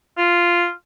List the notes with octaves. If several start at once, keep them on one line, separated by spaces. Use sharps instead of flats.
F4